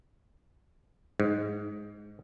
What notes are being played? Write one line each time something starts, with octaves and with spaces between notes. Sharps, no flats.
G#2